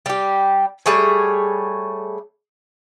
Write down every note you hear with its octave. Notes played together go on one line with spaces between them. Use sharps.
G3 G4
G3 A3 G#4 C#5